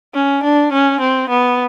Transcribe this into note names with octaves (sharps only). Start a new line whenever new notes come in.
C#4
D4
C#4
C4
B3